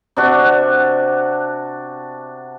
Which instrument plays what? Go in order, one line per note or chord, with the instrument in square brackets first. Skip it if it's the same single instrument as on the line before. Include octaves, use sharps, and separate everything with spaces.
[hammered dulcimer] C3 D4 F#4